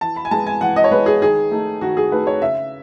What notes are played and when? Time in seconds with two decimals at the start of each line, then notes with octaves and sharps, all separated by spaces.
0.01 E3 A5
0.16 B5
0.25 G#5
0.31 G#3 B3 A5
0.47 G#5
0.61 E3 F#5
0.76 D#5
0.84 C#5
0.91 G#3 B3 B4
1.06 G#4
1.22 D#3 G#4
1.51 A3 D#4
1.81 D#3 F#4
1.97 G#4
2.12 A3 D#4 B4
2.27 C#5
2.41 C#3 E5